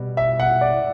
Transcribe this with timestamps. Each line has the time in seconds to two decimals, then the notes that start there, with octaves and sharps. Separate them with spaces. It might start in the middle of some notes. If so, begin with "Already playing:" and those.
Already playing: B2 G3
0.17 E5
0.40 F#5
0.61 D5